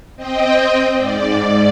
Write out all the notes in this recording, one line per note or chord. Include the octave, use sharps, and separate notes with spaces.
C4 D#5 G5
G#2 D5